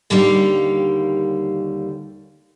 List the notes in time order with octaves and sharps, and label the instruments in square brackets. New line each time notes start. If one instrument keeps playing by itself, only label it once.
[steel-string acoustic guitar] D#2 D3 D#3 G3 C#5 F5